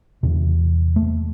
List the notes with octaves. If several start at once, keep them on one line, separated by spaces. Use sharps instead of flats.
E2 C3
A3